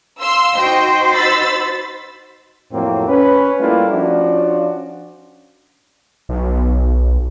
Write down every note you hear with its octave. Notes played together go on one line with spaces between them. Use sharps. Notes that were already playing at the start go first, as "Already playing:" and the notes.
F5 C6 E6
D#4 F#4 C5 D#5 G5
B5 E6 A6
F2 A2 F#3 A#3 C4
C#4 B4
G3 A3 A#3 E4 F4
F3 C#4 D4 F4 F#4
B1